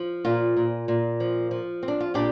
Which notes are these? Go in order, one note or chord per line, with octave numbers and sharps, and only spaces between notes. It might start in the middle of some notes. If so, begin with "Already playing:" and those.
Already playing: F3
A#2 F4
A#2
A#2
F3
F3
C4
D4
F4
A#2 D4 G4